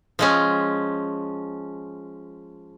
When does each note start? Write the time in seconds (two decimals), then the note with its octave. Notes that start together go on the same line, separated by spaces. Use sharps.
0.19 F3 G#3 C#4